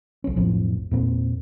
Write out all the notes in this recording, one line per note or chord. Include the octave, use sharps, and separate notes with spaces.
B1 C#4
B1 F2 A2 F3
E2 A#2 C4